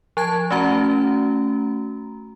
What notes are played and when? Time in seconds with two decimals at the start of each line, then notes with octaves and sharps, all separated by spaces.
0.17 F3 A5 G#6
0.51 A3 C#4 F#4 A#5